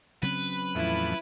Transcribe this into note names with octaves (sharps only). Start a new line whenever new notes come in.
C#3 F#3 C4 B4
E2 A2 F3 E4